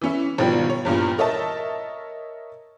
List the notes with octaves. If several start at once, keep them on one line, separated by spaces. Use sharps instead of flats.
E3 C#4 E4
G#1 B2 D#3 F3 G3
C#5
E2 G2 A#2
A#4 C#5 D#5 E5 A5